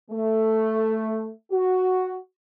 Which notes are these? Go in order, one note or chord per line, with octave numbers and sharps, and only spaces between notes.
A3
F#4